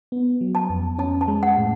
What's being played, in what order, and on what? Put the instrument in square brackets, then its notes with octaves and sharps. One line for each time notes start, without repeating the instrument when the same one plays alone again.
[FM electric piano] B3
F#3
[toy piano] A5
[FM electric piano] F2
[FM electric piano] C#4 [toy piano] A5
[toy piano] A5
[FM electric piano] G#3
[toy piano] F#5
[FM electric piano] A2